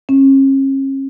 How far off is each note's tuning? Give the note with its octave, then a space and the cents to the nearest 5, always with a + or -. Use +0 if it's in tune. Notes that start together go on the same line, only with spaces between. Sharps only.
C#4 -40